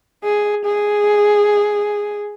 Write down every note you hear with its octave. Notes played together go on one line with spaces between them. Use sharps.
G#4
G#4